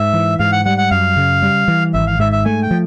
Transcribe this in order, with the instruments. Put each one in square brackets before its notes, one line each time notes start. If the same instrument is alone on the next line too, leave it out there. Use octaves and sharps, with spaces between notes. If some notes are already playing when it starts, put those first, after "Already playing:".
Already playing: [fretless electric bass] G#2 [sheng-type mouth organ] E5
[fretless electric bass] E3
[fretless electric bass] G#2 [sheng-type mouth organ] F5
[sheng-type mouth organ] F#5
[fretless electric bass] G3 [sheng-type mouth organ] F#5
[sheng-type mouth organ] F#5
[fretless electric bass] F#2 [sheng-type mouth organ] F5
[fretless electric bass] C#3
G3
E3
[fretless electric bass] G#1 [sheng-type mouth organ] E5
[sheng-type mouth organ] F5
[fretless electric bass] G#2 [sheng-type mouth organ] E5
[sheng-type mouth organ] E5
[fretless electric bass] A3 [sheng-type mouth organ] G#5
[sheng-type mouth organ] G5
[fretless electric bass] F3